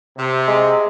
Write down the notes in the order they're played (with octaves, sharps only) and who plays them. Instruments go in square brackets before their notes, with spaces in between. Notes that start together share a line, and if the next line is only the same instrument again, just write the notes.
[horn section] C3
[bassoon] G#3